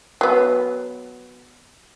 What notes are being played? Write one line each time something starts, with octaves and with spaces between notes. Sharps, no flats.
F#3 B3